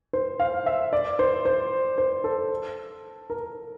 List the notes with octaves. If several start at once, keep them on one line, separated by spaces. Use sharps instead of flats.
C5
F5
E5
D5
C5
C5
C5
A4
A#4